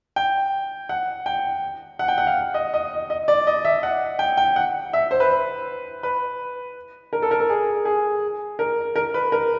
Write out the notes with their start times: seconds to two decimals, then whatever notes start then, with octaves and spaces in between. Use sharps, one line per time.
0.16 G5
0.89 F#5
1.26 G5
1.99 F#5
2.08 G5
2.18 F#5
2.27 F5
2.54 D#5
2.74 D#5
3.10 D#5
3.28 D5
3.47 D#5
3.65 E5
3.83 F#5
4.19 G5
4.37 G5
4.56 F#5
4.93 E5
5.11 C5
5.20 B4
6.03 B4
7.13 A#4
7.22 A4
7.31 A#4
7.40 A4
7.50 G#4
7.85 G#4
8.59 A#4
8.96 A#4
9.14 B4
9.32 A#4